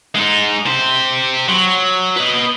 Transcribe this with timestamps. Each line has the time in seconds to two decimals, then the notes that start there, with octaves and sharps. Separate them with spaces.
0.15 G#3 D#4
0.66 G4 C5
1.48 F#3
2.16 B4 D#5